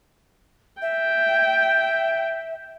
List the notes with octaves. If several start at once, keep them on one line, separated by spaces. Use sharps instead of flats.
E5 G5